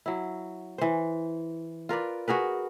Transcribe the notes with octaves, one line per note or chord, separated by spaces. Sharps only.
F#3 E4
E3 C5
F4 A#4 B4 D5
F#4 G#4 A#4 B4